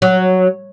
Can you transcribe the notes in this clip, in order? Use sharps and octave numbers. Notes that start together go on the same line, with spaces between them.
F#3